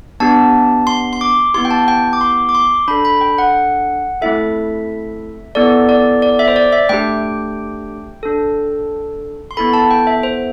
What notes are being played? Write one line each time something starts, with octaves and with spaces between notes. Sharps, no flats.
B3 D4 G4 A5
C6
C6
D6
B3 E4 G4 C6
G5
A5
G5
D6
C6
D6
C6
D4 A4 B5
B5
G5
F#5
A3 C4 E4 A4 E5
B3 E4 A4 D5
D5
D5
E5
C5
D5
E5
A3 D4 G4 G5
D4 A4
C6
B3 E4 A4 B5
A5
G5
E5
C5